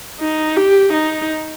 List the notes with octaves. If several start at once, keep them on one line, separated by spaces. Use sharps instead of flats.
D#4
G4
D#4